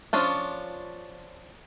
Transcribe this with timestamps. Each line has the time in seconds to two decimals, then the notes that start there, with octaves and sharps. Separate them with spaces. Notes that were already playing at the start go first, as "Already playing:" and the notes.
0.13 F3 C#4 D4 F4